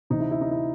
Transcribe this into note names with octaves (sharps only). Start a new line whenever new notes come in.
D2 C3 E3 D#4
E4
E4
D#4
E4